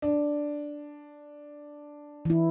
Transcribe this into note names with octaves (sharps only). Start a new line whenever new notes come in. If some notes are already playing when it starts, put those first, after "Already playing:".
D4
E3 E4